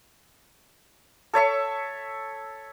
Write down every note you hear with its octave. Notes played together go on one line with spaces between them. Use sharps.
A4 C#5 E5 C#6